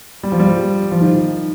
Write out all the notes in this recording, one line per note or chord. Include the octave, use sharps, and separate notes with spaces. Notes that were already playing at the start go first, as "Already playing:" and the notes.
G3
F3
G3
F3
D#3